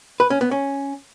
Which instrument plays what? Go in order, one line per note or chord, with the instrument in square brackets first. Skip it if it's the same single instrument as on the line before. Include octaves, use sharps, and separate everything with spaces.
[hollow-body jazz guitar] B4
C#4
B3
C#4